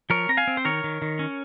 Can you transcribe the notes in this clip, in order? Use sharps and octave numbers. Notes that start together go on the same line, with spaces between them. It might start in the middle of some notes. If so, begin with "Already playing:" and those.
F3 A#4 C#5
C4 A#5
F5 G#5
C4
C5
D#3 A#4 C#5
D#3
D#3
C#4